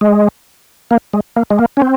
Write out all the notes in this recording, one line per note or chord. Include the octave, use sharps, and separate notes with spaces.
G#3
A#3
G#3
A#3
G#3
A#3
C#4
C4